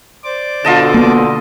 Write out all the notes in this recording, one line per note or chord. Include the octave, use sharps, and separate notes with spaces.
C5 D5 D6
B2 D3 F4 D#5 A5
A#3 B3